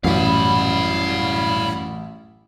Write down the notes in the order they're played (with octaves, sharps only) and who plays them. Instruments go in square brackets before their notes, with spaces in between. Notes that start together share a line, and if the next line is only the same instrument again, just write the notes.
[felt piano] A1 [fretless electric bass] F#2 [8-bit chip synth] A2 G3 E4 [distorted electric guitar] F5 B5